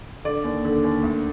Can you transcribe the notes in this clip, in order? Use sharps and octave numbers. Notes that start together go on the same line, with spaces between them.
D3 D5
D#2
D3
D#2
D2